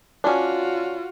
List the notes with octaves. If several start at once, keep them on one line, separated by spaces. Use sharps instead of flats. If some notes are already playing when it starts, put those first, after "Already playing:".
C#4 D4 F4 F#4